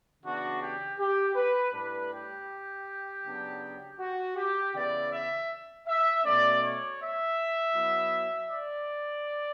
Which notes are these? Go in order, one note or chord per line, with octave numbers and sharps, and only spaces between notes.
C#3 E3 B3 D4 F#4
G4
G4
B4
A2 G3 D4 B4
G4
C#3 F#3 B3 D4
F#4
G4
C#3 E3 B3 E4 D5
E5
E5
B2 A3 C#4 D5
C#5
E5
F#3 B3 E4
D5